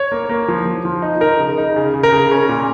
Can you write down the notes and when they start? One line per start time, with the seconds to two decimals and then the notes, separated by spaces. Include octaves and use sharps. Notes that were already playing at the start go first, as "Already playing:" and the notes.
Already playing: C#5
0.12 A#3
0.29 A#3
0.48 F3
0.65 F3
0.85 F3
1.02 D#4
1.20 D#4 A#4
1.39 C#3
1.58 D#4
1.76 C#3
1.94 C#3
2.03 A#4
2.12 C#3
2.31 C#4
2.49 A#2